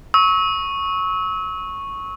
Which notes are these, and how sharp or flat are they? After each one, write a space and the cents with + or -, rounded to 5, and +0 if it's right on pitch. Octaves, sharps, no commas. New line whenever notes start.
C#6 -5 E6 -35